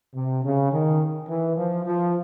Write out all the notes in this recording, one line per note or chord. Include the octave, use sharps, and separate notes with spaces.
C3
C#3
D#3
E3
F3
F3